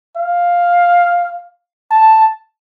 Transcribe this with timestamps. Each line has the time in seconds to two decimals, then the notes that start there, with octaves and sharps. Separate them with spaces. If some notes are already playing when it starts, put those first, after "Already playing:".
0.17 F5
1.91 A5